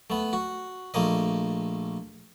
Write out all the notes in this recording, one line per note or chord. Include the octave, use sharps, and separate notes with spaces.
A3 B3
F#4
A#1 A3 A#3 D#5